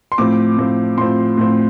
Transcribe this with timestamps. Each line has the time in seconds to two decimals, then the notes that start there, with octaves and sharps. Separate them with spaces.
0.12 C6
0.18 A2 F3 C4 D6
0.58 A2 F3 C4
0.98 A2 F3 C4 C6
1.38 A2 F3 C4